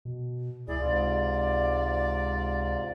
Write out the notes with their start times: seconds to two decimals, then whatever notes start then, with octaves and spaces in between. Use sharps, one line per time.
0.05 B2
0.68 C#2 E4 G#4 D5
0.81 C#2 G#2 C3 F4